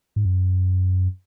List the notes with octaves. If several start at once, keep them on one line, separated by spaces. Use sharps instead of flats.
G#2
F#2